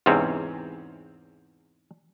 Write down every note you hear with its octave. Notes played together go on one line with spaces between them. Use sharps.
E2 G#2 C3 C4 C#4